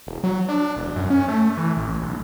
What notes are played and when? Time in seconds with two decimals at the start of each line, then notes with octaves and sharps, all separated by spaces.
0.07 E1
0.24 F#3
0.48 D4
0.76 E1
0.96 F#2
1.10 C#4
1.28 A3
1.57 E3
1.77 A1
2.02 B1